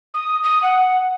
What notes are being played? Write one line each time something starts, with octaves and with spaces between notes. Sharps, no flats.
D#6
D#6
F#5